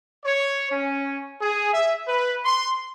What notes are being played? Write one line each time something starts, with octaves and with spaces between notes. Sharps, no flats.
C#5
C#4
G#4
E5
B4
C6